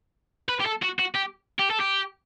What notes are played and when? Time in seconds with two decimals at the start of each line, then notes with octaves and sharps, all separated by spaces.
0.49 B4
0.60 G4
0.66 A4
0.82 F#4
0.99 F#4
1.15 G4
1.59 G4
1.71 A4
1.80 G4